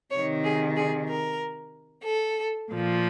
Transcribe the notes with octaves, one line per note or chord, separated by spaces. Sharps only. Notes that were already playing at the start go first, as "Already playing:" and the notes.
C3 D#3 C#5
G#4
G#4
A#4
A4
A#2 F3